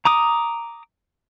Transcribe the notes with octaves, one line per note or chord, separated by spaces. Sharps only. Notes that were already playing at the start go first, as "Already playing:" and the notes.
A#5 D6 D#6